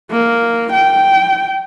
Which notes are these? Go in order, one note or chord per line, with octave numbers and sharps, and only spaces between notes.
A#3
G5